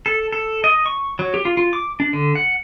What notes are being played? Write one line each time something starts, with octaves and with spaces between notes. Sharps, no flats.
A4
A4
D#5
C#6
F#3
G4
F4
F4
D6
D4
D3
F#5